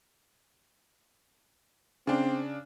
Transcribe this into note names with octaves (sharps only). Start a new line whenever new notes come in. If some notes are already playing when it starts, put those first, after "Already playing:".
C#3 C4 D4